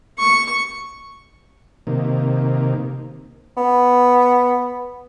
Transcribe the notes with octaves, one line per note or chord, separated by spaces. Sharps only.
C#6
C3 D#3 A#3
B3